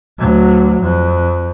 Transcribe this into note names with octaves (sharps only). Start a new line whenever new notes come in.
D2 F#3
F2